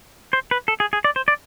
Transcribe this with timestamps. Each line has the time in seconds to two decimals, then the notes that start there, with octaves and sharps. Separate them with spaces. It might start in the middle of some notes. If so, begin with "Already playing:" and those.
0.33 C5
0.51 B4
0.68 A4
0.80 G#4
0.93 G#4
1.04 D5
1.16 C5
1.28 D5